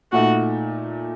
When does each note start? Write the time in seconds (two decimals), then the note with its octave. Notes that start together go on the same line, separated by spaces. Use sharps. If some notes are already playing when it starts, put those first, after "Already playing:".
0.12 A#2 A3 D#4 F#4